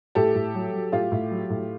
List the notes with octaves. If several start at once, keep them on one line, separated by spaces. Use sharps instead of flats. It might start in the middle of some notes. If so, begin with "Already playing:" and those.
A2 G4 A4
A2
F#3
F#3
A2 F4 G4
A2
F#3
A2